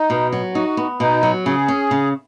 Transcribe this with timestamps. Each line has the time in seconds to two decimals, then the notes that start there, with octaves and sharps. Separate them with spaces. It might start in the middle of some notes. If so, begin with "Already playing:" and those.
Already playing: D#4
0.10 B2
0.33 F#3
0.55 D#4 F#4
0.77 B3
1.00 B2 D#4
1.23 F#3
1.46 C#3 G#4
1.68 C#4
1.91 C#3